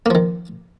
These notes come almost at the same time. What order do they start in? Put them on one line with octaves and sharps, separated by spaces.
A#3 F3 D#3